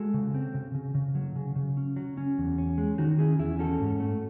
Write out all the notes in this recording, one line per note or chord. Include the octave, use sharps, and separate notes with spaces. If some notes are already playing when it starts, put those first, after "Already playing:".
Already playing: G#3 F#4 A4
C#3
C4
C#3
C#3
C#3
F#3
C#3
C#3
C#4
F#3
C#4
E2
C#4
G#3
D#3 D#4 F#4
C#4 E4 G#4
E2 E4 G#4
C#4 F#4 A4
G#2
A3